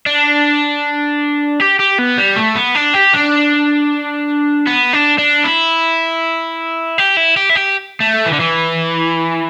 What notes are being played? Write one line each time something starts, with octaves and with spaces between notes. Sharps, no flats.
D4
G4
G4
B3
G3
A3
B3
D4
G4
D4
B3
D4
D4
E4
G4
E4
G4
E4
G4
A3
E3
D3
E3